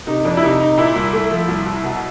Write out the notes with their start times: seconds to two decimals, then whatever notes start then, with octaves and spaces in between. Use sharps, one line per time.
0.07 C3 D#4
0.25 F2 D4
0.37 E4
0.43 C3 D#4
0.60 C3 D#4
0.77 A#2 E4
0.96 C2
1.13 A3
1.31 F3
1.48 C2
1.66 C2
1.84 B2